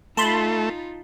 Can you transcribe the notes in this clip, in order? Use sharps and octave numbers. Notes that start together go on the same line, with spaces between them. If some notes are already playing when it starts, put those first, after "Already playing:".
A3 D#4 F4 A5 B5 C6